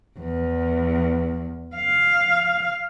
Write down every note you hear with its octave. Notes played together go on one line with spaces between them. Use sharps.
E2
F5